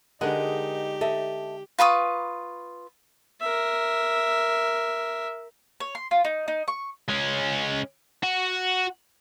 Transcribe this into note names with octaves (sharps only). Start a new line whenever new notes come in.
D3 G#3 D#4 G4 A#4 D#5 F#5
A4 D#5 E5
F4 B4 C#6 D#6
A#4 E5
C#5
C6
F4
D#4
D#4
C#6
G#3 C#4
F#4